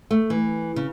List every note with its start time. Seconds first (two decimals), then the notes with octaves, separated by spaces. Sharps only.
0.11 A3
0.30 E3
0.76 C#3